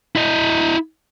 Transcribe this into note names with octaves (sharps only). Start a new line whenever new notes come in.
E4 D#5